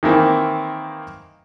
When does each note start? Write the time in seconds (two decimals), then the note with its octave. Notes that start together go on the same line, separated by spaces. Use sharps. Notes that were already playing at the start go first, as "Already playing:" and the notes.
0.03 D#3 E3 A#3 C4